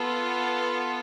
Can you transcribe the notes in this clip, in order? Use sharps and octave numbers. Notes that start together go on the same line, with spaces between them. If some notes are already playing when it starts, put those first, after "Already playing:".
Already playing: B3 F4 A4